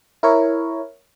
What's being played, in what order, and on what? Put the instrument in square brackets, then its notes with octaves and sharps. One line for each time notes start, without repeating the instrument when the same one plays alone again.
[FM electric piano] E4 A#4 C#5